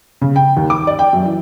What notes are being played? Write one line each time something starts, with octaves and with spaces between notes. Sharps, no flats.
C#3
G5
D#2
D6
D5
G5
F#2
E3